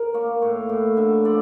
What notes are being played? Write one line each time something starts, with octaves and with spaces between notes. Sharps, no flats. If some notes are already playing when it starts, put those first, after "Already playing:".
Already playing: A#4
A#3 C#5
A2 C#5
A2
D3 E5
F3 D5